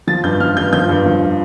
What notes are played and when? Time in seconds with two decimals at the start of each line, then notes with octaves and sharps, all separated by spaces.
0.07 F3 A6
0.23 G2 G6
0.40 F3 F6
0.57 G2 G6
0.73 F3 G6
0.89 G2
1.06 F3